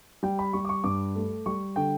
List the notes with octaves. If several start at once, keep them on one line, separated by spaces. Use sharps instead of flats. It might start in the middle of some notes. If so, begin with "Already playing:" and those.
G3 G5
B5
G3 C#6
D6
C#6
G2 D6
A3
G3 C#6
D3 G5